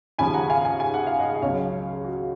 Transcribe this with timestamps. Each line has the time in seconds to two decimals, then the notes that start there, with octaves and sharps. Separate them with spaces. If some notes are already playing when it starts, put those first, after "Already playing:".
0.19 D#2 C#3 F3 G#5 B5
0.34 F#5 A#5
0.50 F5 G#5
0.65 F5 G#5
0.80 G#5
0.94 F#5
1.07 F5
1.19 D#5 F#5
1.34 D#5
1.42 C#2 C#3 F#3 C#5 F5
1.92 G#4
2.04 F#4